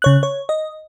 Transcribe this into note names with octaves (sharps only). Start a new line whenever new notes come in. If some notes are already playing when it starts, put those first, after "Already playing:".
C#3 C#5 F#6
C#5
D#5